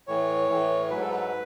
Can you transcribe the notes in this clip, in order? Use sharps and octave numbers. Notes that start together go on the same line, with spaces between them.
A2 E3 C#5
A2 E3
G#2 F#3 B4
A4
B4